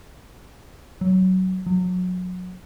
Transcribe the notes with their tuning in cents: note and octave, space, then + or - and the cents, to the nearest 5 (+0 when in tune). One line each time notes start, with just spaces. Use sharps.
F#3 +15
F#3 -30